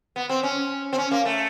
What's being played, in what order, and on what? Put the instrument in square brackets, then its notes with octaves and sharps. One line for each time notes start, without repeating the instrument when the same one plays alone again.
[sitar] B3
C4
C#4
C4
C#4
A#3
A3